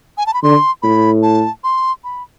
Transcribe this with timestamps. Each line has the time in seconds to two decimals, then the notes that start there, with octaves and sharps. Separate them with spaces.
0.18 G#5
0.27 A5
0.34 B5
0.43 D3 C6
0.82 A2 B5
1.23 A5
1.64 C6
2.04 B5